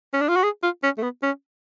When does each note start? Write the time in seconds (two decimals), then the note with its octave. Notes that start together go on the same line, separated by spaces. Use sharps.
0.13 C#4
0.21 D4
0.29 F4
0.36 F#4
0.43 G#4
0.63 F4
0.83 C#4
0.98 A3
1.03 B3
1.23 C#4